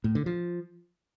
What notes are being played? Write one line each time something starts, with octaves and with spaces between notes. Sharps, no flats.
A2
D3
F3